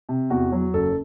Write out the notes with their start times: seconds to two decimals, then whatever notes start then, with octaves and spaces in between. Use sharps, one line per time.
0.09 C3
0.30 E2 F#4
0.52 F#3
0.74 F#1 A4